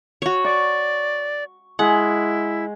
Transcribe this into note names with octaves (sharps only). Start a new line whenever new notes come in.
F#4 C#5
D5 C#6
G#3 E4 F#5